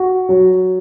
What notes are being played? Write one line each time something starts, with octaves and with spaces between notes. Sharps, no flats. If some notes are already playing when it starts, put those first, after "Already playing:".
Already playing: F#4
F#3